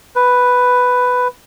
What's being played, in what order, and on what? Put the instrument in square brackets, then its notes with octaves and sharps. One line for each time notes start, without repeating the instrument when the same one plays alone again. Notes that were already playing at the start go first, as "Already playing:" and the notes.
[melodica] B4